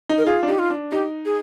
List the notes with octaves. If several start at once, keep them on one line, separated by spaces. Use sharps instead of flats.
D#4
A#4
F4 G#4
D4
D#4 G4
F4
D4
D#4 G4
G#4